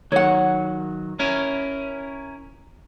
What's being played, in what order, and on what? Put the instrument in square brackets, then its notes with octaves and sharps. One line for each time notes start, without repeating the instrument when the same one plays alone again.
[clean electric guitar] D#3 F#3 [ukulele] C#5 F#5
[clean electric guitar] C#4 E4 A#4